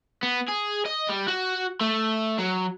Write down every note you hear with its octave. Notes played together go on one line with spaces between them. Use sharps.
B3
G#4
D#5
G3
F#4
A3
F#3